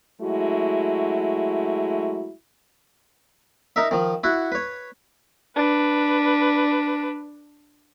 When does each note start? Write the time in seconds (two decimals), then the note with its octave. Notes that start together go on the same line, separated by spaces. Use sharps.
0.21 F#3 G#3 A3 E4 F#4
3.76 D#4 A#4 E5
3.91 D#3 F3
4.24 E4 F#4 F#5
4.52 B4 C#5
5.56 D4 B4